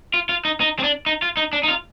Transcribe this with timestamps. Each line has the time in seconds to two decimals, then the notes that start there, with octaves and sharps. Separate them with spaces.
0.14 F4
0.29 F4
0.45 D#4
0.60 D#4
0.79 C4
0.84 D4
1.06 D#4
1.22 F4
1.37 D#4
1.53 D4
1.63 D#4
1.68 F4